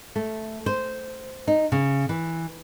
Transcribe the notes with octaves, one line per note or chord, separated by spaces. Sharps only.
A3
C5
D#4
C#3
E3